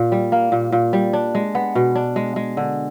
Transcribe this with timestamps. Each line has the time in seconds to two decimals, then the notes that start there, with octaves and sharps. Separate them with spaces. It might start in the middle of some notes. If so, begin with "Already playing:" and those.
Already playing: A#2
0.12 G3
0.32 A#3
0.52 A#2
0.72 A#2
0.93 G3
1.13 D4
1.35 G#3
1.55 B3
1.75 B2
1.95 D4
2.16 G#3
2.36 G#3
2.57 D3